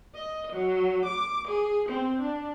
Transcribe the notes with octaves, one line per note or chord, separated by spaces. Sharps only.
D#5
F#3
D6
G#4
C4
D4